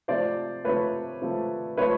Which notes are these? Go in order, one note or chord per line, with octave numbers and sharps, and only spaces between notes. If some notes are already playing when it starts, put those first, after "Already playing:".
C3 F3 A3 C5 D5
C3 F3 A3 B4 C#5
C3 F3 A3
C3 F3 A3 B4 C#5